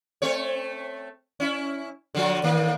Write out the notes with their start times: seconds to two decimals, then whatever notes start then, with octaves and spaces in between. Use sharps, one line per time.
0.22 A3 C4 C#5
1.40 C#4 E4
2.15 D3 F3 F#3
2.43 A2 D#3 A#3